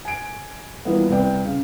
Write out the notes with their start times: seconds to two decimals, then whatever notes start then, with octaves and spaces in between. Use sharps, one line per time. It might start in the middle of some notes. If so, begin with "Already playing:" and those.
0.05 G#5 D7
0.85 E3 F3 G3 A#3 B3
1.10 C2 G3 B4 D5 G5
1.45 C#3